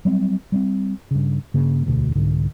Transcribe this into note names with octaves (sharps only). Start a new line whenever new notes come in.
F#3 G3 C4
G3 A3 C4
G2 C#3
G2 C#3 A#3
E1 D2 B2
C2 G#2 D3